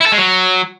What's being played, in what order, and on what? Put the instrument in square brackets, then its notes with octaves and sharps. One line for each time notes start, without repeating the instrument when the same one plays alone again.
[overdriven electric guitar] E4
A4
G#3
F#3